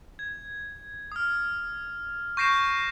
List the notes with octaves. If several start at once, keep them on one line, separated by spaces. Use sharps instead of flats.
G#6
D#6 F6
C#6 G6 A#6 C7 D7 E7